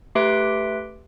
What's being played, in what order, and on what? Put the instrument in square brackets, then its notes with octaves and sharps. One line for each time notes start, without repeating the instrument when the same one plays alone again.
[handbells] A3 G4 B4 E5 C6 D7